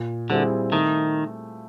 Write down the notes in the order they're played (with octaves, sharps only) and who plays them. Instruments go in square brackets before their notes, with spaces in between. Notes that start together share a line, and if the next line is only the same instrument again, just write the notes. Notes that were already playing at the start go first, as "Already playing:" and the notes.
Already playing: [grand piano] A#2
[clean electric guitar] D3 [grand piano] G3 C4 E4 G#4
[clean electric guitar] D#3 [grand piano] A3